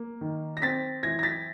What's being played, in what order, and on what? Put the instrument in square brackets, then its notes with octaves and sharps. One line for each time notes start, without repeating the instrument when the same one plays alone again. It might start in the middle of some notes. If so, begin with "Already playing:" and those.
Already playing: [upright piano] A#3
D#3
A#6
C4 A6 B6
E3 G#6 A#6
A#6
A6 B6